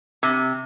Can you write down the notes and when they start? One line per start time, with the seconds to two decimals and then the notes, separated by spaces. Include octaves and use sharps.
0.23 C3